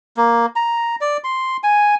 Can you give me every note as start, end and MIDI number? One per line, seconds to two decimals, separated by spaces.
0.17 0.46 58
0.56 0.96 82
1.01 1.17 74
1.24 1.57 84
1.63 1.95 80